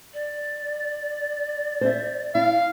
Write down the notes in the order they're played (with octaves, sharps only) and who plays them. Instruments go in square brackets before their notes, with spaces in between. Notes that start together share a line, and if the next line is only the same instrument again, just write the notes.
[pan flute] D5
[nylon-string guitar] C5 E5
[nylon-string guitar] E4 [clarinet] F5